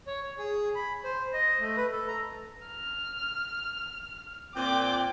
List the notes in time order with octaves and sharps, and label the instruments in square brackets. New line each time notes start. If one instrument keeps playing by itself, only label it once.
[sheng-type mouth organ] C#5
C#5
G#4
B5
C5
D#5
A3
B4
A4
A#5
[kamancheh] F6
[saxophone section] A#2 C4 [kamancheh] G5 D6